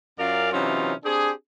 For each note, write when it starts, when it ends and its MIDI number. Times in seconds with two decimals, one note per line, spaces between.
0.19 0.50 42
0.19 0.50 61
0.19 0.50 65
0.19 0.50 70
0.19 0.50 74
0.19 0.50 77
0.52 0.93 48
0.52 0.93 52
0.52 0.93 54
0.52 0.93 61
0.52 0.93 63
0.52 0.93 65
1.04 1.31 60
1.04 1.31 62
1.04 1.31 67
1.04 1.31 68